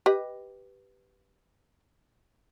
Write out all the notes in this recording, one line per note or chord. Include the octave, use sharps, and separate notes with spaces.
G4 B4 D#5